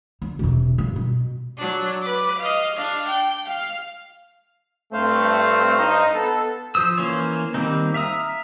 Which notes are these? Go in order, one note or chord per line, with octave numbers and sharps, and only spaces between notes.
D3
E1 C3
G2
B2
F#3 D4
B4 D6
D#5 F5
D4 F5
G5
F5
G2 A3 C4 C5 F5
D#4
B3 A4
F3 C5 D#6 E6
E3 A#3 C#4 C5 C#5
D#3 G3 A#3 C4 D#4
E5 F5 A#5 D#6 E6